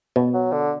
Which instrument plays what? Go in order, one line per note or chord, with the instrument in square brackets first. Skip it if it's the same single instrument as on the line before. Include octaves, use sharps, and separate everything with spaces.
[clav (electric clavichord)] B2
[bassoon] F#3
D3